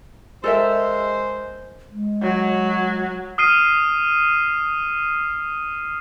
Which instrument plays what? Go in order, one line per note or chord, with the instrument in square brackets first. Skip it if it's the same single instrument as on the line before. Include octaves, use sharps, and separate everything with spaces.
[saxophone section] G#3 C5 [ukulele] A4 A#4 E5
[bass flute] G#3
[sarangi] F#3
[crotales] D#6 F6 C7 D#7